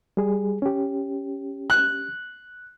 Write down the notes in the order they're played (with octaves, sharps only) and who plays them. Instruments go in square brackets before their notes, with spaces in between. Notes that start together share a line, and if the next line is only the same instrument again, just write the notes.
[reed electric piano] G3 G#4
C#4 G4
[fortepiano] F#6